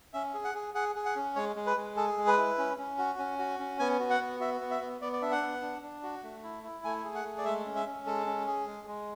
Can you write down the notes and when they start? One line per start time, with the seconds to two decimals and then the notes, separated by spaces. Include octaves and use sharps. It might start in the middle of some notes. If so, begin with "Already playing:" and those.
0.14 C#4 E5
0.34 G#4
0.44 F#5
0.54 G#4
0.74 G#4 F#5
0.95 G#4
1.06 F#5
1.16 C#4
1.36 G#3 C#5
1.56 G#3
1.67 B4
1.77 G#3
1.96 G#4 A4
2.17 G#3
2.27 B4
2.37 E4
2.58 C#4
2.78 C#4
2.98 F#4
3.18 C#4
3.39 F#4
3.59 C#4
3.79 B3 G#5
4.00 F#4
4.10 F#5
4.20 B3
4.40 F#4 E5
4.61 B3
4.71 E5
4.81 B3
5.01 B3 D5
5.13 D5
5.22 D4 E5
5.32 F#5
5.42 B3
5.62 D4
5.82 D4
6.03 F#4
6.23 A3
6.43 E4
6.64 E4
6.84 A3 G#5
7.04 G#4
7.15 F#5
7.25 A3
7.38 D5
7.45 G#3 E5
7.65 C#4
7.76 E5
7.86 C#4
8.06 G#3 A4
8.26 C#4
8.47 G#4
8.67 G#3
8.87 G#3